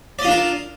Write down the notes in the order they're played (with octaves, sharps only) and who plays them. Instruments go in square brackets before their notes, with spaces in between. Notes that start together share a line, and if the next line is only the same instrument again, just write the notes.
[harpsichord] D5
D#5
F4
D4
A#4